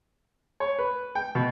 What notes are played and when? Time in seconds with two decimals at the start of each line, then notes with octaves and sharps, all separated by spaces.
0.60 C#5
0.79 B4
1.15 G5
1.35 B2